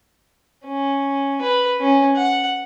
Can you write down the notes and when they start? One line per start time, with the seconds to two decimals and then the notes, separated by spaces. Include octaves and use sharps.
0.65 C#4
1.42 B4
1.81 C#4
2.16 F#5